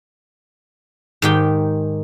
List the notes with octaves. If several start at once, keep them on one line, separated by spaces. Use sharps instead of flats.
G#2 D#3 G4